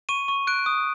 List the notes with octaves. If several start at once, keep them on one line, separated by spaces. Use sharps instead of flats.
C#6 D#7
C#6
F#6 D7
D#6